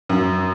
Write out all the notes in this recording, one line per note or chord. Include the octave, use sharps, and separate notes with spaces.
F#2